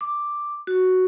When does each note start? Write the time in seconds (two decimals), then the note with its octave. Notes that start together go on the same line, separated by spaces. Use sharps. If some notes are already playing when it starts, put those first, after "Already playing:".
0.01 D6
0.67 F#4